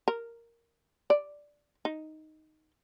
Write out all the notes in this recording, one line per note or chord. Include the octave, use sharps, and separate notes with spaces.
A#4
D5
D#4